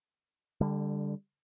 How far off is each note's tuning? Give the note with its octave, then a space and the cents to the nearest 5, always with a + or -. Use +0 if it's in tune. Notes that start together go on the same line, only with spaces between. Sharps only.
D3 +0 G3 +30